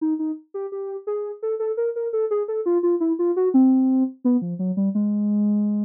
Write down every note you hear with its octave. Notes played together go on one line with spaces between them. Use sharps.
D#4
D#4
G4
G4
G#4
A4
A4
A#4
A#4
A4
G#4
A4
F4
F4
E4
F4
F#4
C4
B3
F3
F#3
G3
G#3